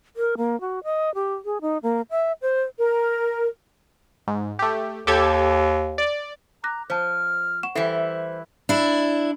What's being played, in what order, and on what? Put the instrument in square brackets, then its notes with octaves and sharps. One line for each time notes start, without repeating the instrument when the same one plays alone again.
[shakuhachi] A#4
A#3
F#4
D#5
G4
G#4
D#4
A#3
E5
C5
[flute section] A#4
[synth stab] G#2
A3 G4
[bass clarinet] D#2 [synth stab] G4 A4 G#6
[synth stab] D5
[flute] A#5 [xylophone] D6 F#6 A#6
[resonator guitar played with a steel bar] F3 [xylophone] C5 A5 [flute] F6
[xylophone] F#5 C#6 E7
[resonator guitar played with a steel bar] E3 G3 E4 [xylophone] A4 E5 C7 [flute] C5
[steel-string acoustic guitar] D4 E4